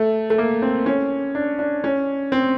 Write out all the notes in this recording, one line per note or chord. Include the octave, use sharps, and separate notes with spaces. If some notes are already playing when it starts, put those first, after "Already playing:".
Already playing: A3
A3
A#3
C4
C#4
D4
D4
C#4
C4